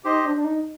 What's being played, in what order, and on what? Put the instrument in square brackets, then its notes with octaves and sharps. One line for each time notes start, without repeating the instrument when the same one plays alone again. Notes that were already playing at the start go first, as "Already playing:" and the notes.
[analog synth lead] D#4 [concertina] G4 C5 D#5
[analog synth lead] D4
D4
D#4